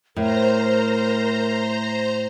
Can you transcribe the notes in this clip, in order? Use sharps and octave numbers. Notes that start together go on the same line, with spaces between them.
A2 A#4 C5 A#5